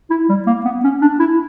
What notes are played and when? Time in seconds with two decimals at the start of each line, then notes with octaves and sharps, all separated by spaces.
0.10 E4
0.29 G3
0.47 A#3
0.65 B3
0.84 C#4
1.01 D4
1.19 E4